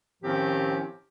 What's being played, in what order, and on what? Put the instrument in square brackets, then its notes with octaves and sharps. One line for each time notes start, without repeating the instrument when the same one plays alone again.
[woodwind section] A2 D#3 F3 C4 C#4 G4